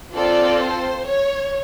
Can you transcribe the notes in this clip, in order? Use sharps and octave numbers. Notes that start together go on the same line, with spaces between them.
C4 F4 A4 D5
C5
C#5